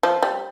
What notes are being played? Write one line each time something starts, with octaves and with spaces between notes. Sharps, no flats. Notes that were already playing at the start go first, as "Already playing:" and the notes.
F3
G3